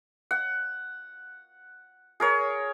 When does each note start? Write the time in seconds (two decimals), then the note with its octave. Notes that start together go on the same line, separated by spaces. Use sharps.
0.31 F#5
2.20 G#4 A#4 C#5